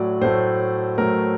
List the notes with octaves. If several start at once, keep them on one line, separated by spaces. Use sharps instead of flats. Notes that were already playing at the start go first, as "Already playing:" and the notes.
Already playing: A2 F#3 A3 D5
A2 F#3 A3 C5
A2 F#3 A3 A#4